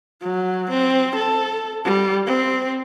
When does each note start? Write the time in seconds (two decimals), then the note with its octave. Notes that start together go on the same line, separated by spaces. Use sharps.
0.22 F#3
0.69 C4
1.15 A4
1.85 G3
2.26 C4